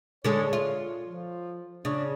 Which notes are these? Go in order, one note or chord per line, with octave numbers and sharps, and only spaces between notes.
D3 G#3 A4 C#5
F4
F3
C#3 D4